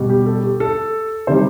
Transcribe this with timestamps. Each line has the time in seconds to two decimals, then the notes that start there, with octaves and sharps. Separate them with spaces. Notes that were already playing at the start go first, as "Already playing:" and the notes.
Already playing: B2 G3
0.10 G4
0.26 A4
0.43 G4
0.60 A4
1.27 C3 D#3 G3 C5